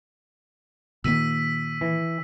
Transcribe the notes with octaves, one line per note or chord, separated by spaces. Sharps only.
A#2 D#3 A#3 E6 B6 D#7
E3